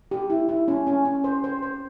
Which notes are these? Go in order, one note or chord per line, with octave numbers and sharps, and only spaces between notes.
G4
E4
E4
C#4
C#4
C#4
C5
C5
C5